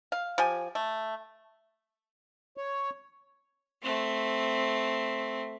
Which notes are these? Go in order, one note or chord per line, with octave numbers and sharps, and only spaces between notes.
F5
F3 G4 G#5
A3
C#5
A3 C4